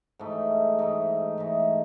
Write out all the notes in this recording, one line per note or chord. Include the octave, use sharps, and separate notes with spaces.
G#2 E3 A3 D#4
G#2 E3 A3 D#4
G#2 E3 A3 D#4